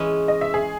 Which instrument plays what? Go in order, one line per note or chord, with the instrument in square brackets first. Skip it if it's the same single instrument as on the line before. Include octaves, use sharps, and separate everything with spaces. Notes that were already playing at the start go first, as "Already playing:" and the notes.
Already playing: [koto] E3 G#3 C#4
[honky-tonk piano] D#5
E5
G#4